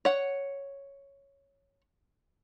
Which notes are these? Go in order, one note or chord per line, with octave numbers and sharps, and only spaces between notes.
C#5 F#5